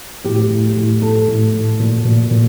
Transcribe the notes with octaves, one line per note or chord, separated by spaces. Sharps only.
A2 G4
A2
A2
A2 A4
A2
A2
A#2
A#2
A#2